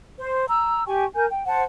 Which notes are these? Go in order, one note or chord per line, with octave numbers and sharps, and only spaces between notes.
C5
A#5 E6
G4 G5 G#5 C#6
A#4 G#5 G6
G5
C5 F#5 A5